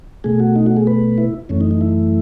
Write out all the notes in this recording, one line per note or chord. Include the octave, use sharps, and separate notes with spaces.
B2 A3 G#4
F#4
D#4
F#4
G#4
B4
E4
F#2 E3 A3 C#4
D#4
D#4
E4